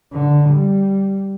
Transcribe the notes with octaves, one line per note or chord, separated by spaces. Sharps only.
D3
G3